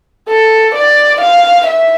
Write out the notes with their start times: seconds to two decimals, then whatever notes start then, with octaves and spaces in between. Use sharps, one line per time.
0.29 A4
0.75 D5
1.21 F5
1.67 E5